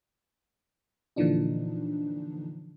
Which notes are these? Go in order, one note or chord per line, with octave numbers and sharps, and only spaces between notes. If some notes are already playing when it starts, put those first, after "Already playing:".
A#2 D3 E3 F3 D4 D#4